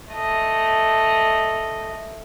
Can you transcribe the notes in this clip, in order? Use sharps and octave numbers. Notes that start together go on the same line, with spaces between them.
A3 D#5